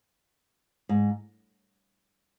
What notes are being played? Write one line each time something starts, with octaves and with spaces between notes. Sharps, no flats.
G#2